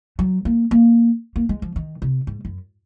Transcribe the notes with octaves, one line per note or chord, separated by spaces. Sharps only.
F#3
A#3
A#3
A#3
G#3
F3
D#3
C3
G#2
F#2